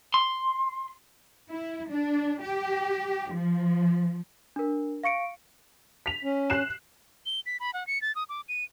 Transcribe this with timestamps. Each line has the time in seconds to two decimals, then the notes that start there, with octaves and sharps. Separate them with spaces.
0.14 C6
1.51 E4
1.90 D4
2.43 G4
3.32 F3
4.56 D4 A#4
5.04 F5 C#6 C#7 D7
6.06 B6 F7
6.24 C#4
6.50 F#6 C7 E7
7.25 G7
7.46 B6
7.60 B5
7.74 F#5
7.87 C#7
8.02 A6
8.15 D#6
8.29 D6
8.48 D#7